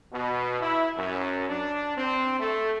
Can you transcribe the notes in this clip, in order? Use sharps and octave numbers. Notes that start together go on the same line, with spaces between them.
B2
E4
F#2
D4
C4
A3